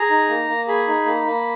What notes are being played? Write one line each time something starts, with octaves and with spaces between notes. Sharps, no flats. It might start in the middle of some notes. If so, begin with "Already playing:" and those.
Already playing: G#4 A#5
D#4
A#3
A#3
G#4 B5
D#4
A#3
A#3